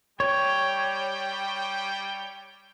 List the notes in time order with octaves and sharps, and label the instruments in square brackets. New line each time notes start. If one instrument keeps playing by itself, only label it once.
[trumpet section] G3 G5 [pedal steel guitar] C#5